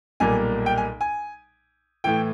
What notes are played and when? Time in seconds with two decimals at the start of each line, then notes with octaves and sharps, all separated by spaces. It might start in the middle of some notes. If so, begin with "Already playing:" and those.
0.20 B1 A#2 G3 A#3 G#5
0.66 G5
0.78 G#5
1.01 G#5
2.04 A2 E3 G5